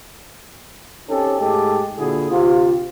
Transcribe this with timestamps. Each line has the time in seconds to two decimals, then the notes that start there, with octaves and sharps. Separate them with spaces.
1.08 C4 C#4 D#4 G4 A4
1.39 G#2 G#3 A3 G4 A4
1.98 A#2 D3 E4 F#4 G#4
2.30 D2 C3 F4